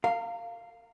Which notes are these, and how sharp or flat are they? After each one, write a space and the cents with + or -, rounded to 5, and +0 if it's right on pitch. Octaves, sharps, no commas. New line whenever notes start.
A#4 -35 F5 -5